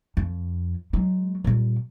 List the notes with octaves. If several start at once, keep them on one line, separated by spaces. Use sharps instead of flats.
F2
F#3 G#3
A#2 G3